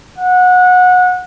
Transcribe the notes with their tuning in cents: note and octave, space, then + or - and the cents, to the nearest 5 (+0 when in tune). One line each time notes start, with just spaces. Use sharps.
F#5 -25